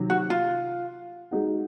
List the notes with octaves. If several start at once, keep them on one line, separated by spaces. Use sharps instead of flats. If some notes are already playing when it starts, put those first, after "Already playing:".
Already playing: C3 D#3 F#3
F#4
F4
G#3 D#4 F#4